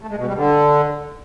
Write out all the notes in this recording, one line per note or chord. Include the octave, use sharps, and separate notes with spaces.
A3
G#3
B2
G3
D3